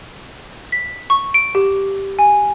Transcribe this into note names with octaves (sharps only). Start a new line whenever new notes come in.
B6
C#6
D7
G4
G#5